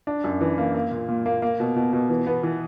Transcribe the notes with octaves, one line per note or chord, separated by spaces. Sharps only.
D4
F#2
E3
A#3
A#3
A#2
A#2
A#3
A#3
B2
B2
B2
E3
B3
E3